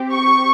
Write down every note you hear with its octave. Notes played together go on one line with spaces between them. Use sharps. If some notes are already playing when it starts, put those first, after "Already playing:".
Already playing: C4 G4
C#6